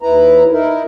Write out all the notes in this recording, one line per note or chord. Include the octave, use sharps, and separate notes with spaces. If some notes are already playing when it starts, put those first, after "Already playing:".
D#2 E4 B4 A#5
D#4 E4 A#4